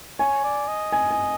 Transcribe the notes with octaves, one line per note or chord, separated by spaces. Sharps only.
C#5 G#5
D5
D#5
G#5
G#5